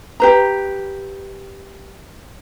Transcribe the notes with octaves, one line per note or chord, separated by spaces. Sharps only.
G4 B4 A#5